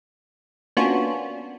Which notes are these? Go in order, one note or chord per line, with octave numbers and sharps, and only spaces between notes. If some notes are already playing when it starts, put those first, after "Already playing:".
A#3 B3 C#4 D4 F4 F#4